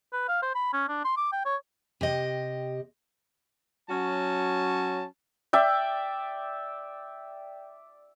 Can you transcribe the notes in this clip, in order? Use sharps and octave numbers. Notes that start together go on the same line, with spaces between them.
B4
F5
C5
B5
C#4
D4
C6
D6
G5
C#5
C3 G4 D#5
F#3 C#4 F#4 A5
D5 E5 G5